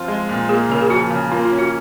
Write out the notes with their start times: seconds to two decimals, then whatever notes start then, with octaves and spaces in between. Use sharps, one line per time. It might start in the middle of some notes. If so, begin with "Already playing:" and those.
Already playing: F3 C4 F4
0.08 G#3
0.29 A#2
0.49 A#3 G#4
0.69 C#3 A#4
0.81 G#4
0.90 F3 F#4
1.10 C#3
1.31 A#3 F4
1.45 F4
1.52 C#4
1.59 F#4